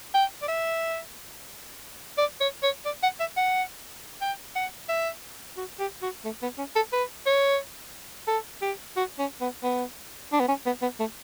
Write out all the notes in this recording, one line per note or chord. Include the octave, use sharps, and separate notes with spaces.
G5
D5
E5
D5
C#5
C#5
D5
F#5
E5
F#5
G5
F#5
E5
F#4
G4
F#4
A3
B3
C#4
A4
B4
C#5
A4
G4
F#4
C#4
B3
B3
D4
B3
C#4
B3
B3
A3